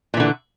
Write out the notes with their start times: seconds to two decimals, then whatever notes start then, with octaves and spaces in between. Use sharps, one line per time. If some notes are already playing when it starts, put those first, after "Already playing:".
0.14 A#2
0.17 E3
0.20 D3